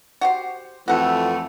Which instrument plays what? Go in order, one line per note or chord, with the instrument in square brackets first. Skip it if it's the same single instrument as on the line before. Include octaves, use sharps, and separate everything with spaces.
[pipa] F#4 G4 C5
[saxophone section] F2 E3 A3 [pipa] F#4 F#5